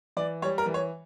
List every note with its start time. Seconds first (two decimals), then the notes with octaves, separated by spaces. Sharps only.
0.17 E3 D5
0.42 G3 C#5
0.58 A#4
0.66 E3
0.74 C#5